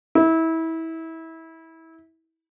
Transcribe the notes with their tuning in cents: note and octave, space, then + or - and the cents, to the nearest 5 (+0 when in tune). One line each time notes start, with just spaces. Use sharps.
E4 -25